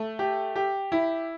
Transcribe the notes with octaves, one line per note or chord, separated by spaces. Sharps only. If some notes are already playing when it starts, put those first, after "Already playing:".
Already playing: A3
G4
G4
E4